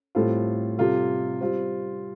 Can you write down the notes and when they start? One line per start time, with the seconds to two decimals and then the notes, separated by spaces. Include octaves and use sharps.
0.15 A2 G3 C4 F4 A4
0.78 C3 G3 F4 A4
1.41 G3 C4 F4